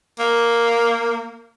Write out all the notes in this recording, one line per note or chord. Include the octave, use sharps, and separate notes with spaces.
A#3